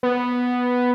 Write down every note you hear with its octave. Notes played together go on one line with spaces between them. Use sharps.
B3